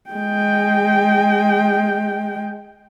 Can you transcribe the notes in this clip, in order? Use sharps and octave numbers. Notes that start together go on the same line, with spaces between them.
G#3 G5